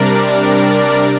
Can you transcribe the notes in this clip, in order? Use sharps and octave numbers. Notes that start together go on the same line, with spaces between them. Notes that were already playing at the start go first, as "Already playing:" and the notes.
Already playing: C3 G3 D4 A#4 D5